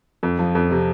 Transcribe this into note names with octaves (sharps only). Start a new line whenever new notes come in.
F2
F3
F2
C3